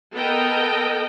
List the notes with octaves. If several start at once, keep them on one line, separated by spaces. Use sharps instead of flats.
B3 A4 A#4 D#5 G5